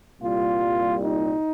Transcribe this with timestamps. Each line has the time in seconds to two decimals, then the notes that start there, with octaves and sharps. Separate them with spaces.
0.20 C2 A#2 G3 F4
1.03 D#4